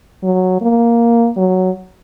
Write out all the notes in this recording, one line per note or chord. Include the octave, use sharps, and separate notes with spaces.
F#3
A#3
F#3